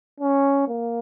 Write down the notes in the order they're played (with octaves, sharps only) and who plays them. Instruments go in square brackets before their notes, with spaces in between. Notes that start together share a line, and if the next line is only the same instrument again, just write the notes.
[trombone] C#4
A#3